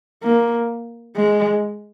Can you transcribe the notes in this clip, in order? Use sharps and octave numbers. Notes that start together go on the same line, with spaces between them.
A#3
G#3